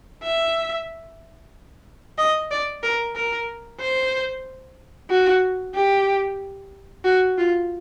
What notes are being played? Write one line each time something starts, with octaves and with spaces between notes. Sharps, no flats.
E5
D#5
D5
A#4
A#4
C5
F#4
G4
F#4
F4